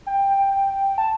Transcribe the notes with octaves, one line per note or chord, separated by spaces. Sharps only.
G5
A5